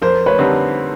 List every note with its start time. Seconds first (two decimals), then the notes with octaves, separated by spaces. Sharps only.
0.02 F2 A#4 C5
0.26 B4 C#5
0.38 D3 G3 C4 D#4